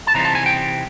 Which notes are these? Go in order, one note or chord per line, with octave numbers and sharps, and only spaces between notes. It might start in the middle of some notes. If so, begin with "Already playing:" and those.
A5
C3 E3 G3 C4 D#4 A#5
A5
G#5
G5